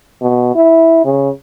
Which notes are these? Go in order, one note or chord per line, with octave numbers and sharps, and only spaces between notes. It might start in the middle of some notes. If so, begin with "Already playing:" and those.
B2
E4
C#3